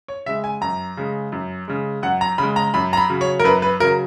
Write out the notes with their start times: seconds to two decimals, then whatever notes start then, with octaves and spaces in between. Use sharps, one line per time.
0.08 C#5
0.26 C#3 G#3 E5
0.44 G#5
0.61 F#2 A#5
0.97 C#3 G#3
1.32 F#2
1.68 C#3 G#3
2.03 F#2 F#5
2.21 A#5
2.38 C#3 G#3 B5
2.56 A#5
2.74 F#2 B5
2.93 A#5
2.97 B5
3.09 C#3 F#3
3.21 C#5
3.40 A#4
3.44 F#2 B4
3.62 B4
3.80 C#3 F#3 A#4